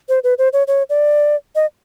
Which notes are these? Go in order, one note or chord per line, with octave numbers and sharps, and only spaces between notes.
C5
B4
C5
C#5
C#5
D5
D#5